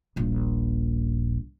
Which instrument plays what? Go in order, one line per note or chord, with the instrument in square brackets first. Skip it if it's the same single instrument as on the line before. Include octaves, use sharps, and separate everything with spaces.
[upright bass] D#1 A#1